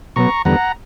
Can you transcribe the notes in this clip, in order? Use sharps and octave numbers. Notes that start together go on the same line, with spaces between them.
B2 F#3 B3 A#5 C#6
E2 D3 G3 B3 F#5 A#5